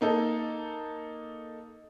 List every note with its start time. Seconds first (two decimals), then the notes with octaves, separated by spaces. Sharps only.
0.01 A#3 D#4 A4